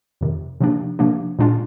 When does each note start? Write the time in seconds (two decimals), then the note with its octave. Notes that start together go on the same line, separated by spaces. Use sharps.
0.21 F2 C3 D#3
0.61 C3 F3 A#3 D4
0.99 C3 F3 A#3 D4
1.39 A#2 G#3 D4 F4